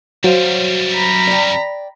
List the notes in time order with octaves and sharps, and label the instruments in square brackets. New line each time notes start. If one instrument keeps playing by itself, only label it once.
[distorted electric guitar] F#2 G3 [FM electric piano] F#3 [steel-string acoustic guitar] C5 F5
[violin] A#5 B5
[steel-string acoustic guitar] D5 G5